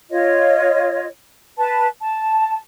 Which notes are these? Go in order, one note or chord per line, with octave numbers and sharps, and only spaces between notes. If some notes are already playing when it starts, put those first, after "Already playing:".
F4 C#5 D#5
B4 A5
A5